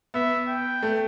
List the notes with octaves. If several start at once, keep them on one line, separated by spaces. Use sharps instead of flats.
B3 E5
G5
A3